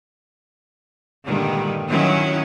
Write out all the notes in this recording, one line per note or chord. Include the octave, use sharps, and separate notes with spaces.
G2 A#2 D3 D#3 G3 G#3
D#3 F#3 C#4 E4